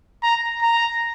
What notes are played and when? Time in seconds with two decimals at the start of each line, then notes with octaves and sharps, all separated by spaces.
0.23 A#5
0.62 A#5